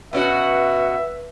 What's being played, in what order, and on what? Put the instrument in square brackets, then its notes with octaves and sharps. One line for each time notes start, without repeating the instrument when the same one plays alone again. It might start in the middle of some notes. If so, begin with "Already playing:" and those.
[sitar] B2 C#4 F#4 [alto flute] B4 [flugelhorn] E5